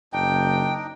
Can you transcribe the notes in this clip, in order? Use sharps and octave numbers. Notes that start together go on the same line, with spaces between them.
F#1 D4 D#4 G5